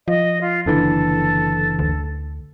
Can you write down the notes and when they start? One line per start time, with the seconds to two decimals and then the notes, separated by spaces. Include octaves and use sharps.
0.08 F3 D#5
0.41 F4
0.66 F#1 D3 E3 A4
1.79 D2